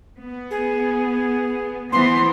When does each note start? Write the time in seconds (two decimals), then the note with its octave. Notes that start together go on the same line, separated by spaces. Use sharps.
0.19 B3
0.50 G#4
1.92 E3 B3 C5 C6